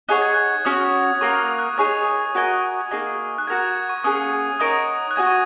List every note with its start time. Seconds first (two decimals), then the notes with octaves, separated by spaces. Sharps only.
0.09 D#4 G#4 C#5 F#5 F#6
0.22 G#6
0.34 F#6
0.65 C#4 F#4 C#5 D#6
1.21 A#3 F#4 A#4 C#6
1.40 D#6
1.59 F#6
1.78 D#4 G#4 C#5 D#6
2.35 F#4 A#4 D#5 G#5
2.91 A#3 D#4 G#4 D#5
3.38 F#6
3.47 F#4 A#4 F#5 G#6
3.61 F#6
3.89 C#6
4.04 A#3 C#4 G#4 F#5 D#6
4.60 D#4 A#4 C#5 F#5 D#6
5.11 F#6
5.16 F#4 D#5 G#5 G#6
5.27 C#6